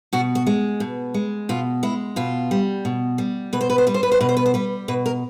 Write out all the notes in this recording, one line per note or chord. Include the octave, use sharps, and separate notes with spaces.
B2 F#4
F#4
G#3
B2
G#3
B2 F4
G#3 E4
B2 F4
G3
B2
G3
B2 B4
C5
B4
C5
G3 B4
C5
B4
C5
B2 B4
C5
B4
C5
G3 B4
B2 B4
A#4